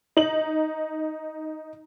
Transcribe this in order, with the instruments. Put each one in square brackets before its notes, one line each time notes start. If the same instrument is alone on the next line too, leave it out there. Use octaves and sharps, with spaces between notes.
[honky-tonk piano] D#4 F#7